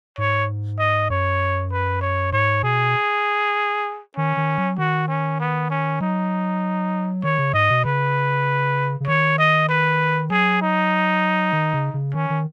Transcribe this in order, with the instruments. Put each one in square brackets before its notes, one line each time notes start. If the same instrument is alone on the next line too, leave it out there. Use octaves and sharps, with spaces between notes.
[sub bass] G#2 [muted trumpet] C#5
[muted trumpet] D#5
[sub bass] F#2 [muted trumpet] C#5
[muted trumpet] B4
C#5
[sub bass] G#2 [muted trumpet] C#5
[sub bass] B2 [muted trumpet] G#4
[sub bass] D#3 [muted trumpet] C#4
[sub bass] D#3
F#3
[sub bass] D#3 [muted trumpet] F#4
[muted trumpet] C#4
B3
C#4
[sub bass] F#3 [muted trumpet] D#4
[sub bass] D#3 [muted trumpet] C#5
[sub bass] C#3
[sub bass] G#2 [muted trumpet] D#5
[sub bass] B2
[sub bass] C#3 [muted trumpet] B4
[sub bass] C#3
[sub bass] D#3 [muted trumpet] C#5
[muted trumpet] D#5
B4
[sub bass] F#3 [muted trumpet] G#4
[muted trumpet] D#4
[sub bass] D#3
C#3
C#3
[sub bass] D#3 [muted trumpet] C#4
[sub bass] D#3